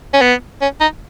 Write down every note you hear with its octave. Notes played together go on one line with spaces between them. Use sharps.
C#4
B3
C#4
D#4